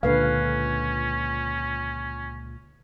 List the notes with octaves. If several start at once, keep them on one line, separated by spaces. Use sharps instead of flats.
C#2 A#2 D3 C#4 B4 F5